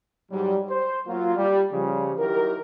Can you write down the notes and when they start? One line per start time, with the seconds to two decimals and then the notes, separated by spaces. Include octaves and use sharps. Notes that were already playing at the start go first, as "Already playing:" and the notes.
0.31 G#2 F#3 G3
0.69 C5
1.07 F#3 A#3 F4
1.36 G3
1.72 C#3 F3 G3
2.18 D#3 F#3 E4 G4 A#4